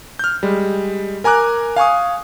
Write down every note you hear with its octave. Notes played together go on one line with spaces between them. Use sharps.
F6 G6
G3 G#3
A#4 G#5 A#5 D6 F#6
F5 G#5 C#6 D#6